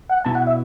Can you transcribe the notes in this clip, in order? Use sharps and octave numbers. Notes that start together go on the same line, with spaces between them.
F#5
B2 B3 E4 A5
F#5
E5